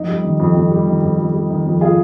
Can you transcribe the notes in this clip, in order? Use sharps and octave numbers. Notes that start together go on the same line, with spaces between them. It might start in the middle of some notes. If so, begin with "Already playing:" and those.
Already playing: F2 D#4
G3
D#3
F2
F2
G3
D#3
F2
F2
G3
D#3
F2
F4 G#4